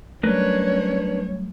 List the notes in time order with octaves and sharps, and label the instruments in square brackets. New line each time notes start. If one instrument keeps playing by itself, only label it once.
[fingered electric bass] F#3 G3 A3 [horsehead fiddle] C#4 C#5 [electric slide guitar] D4 A#4 B4